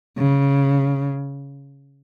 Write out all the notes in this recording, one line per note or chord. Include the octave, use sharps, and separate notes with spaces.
C#3